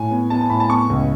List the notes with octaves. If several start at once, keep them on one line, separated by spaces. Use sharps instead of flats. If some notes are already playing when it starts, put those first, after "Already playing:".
Already playing: A2 G#5
B3
B3 A5
A5
A2 B5
A5
B3 C#6
C#2